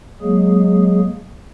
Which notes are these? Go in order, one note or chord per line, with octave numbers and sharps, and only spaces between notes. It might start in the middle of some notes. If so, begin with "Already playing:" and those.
F#3 G#3 A#3 G#4